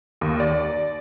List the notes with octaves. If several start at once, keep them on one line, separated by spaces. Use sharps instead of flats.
D#2
D5